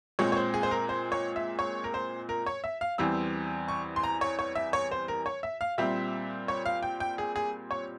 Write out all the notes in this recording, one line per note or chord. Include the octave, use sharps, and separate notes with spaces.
A#2 G#3 C4 C#5
C#5
C5
G#4
C5
A#4
C5
C#5
E5
C#5
A#4
C5
A#4
C#5
E5
F5
E2 E3 G3 C4 E6
C#6
C6
A#5
C#5
C#5
E5
C#5
C5
A#4
C#5
E5
F5
A#2 G3 C4 E5
C#5
F5
G5
G5
G#4
G#4
C#5